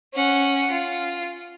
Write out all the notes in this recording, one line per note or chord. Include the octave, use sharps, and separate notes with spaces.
C#4 F#5
F4